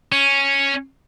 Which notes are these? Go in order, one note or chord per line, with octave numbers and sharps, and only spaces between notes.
C#4